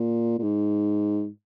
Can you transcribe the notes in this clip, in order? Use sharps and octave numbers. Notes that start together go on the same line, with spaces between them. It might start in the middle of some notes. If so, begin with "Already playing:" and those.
Already playing: A#2
A#2
G#2